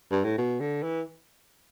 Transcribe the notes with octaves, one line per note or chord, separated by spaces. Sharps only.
G2
A2
B2
D3
E3